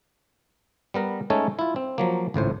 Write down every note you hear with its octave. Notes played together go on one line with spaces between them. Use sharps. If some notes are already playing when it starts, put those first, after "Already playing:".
G3 B3 A#4 B4
G#3 A3 C#4 D#4 A4 C#5
E4 F4
C4
F3 F#3 A#3
G#1 C#2 A2 C5